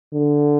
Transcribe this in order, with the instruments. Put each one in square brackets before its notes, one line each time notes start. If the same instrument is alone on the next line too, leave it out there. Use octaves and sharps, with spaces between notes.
[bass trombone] D3